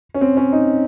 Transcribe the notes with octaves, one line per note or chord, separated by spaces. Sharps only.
C#4
C4
C#4
D#4